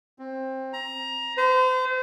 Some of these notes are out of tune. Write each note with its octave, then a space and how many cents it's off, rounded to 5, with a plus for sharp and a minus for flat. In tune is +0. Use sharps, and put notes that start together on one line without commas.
C4 +15
A#5 +20
C5 -35